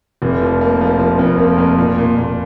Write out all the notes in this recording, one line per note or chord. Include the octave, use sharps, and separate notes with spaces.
F1
F3
A#3
F3
F3
F2
A#3
F2
A#2
A#2
A#2